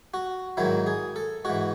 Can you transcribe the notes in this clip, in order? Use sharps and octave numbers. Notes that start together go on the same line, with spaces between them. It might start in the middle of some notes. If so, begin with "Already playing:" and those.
F#4
G#2 D#3 F#3 E4
G#4
A4
G#2 E3 F#4